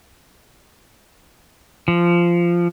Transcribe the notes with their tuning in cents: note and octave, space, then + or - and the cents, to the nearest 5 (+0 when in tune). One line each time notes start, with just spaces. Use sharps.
F3 -15